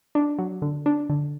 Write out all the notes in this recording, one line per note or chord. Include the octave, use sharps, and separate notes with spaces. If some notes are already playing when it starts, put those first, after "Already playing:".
D4
F#3
D3
D4
D3